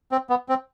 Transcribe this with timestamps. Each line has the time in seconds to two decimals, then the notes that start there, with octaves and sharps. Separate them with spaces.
0.12 C4
0.30 B3
0.49 C4